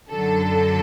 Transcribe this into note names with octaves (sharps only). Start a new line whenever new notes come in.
F#2 D3 F#3 A4